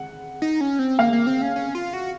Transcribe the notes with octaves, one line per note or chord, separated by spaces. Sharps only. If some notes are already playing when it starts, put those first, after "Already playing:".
Already playing: F#5
D#4
C#4
C4
A#3 F5
A#3
C4
C#4
C#4
F4
F#4